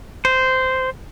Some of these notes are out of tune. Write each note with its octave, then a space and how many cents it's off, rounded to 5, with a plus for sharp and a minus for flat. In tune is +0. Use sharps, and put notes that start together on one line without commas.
C5 -10